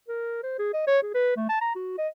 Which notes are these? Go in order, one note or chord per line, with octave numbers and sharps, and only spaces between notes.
A#4
C5
G#4
D#5
C#5
G#4
B4
A3
A5
A#5
F#4
D#5